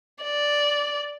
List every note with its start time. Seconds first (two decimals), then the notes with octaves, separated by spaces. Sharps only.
0.23 D5